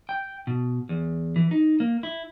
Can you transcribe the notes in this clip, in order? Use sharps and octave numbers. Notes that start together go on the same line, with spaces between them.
G5
B2
E2
E3
D#4
A#3
E4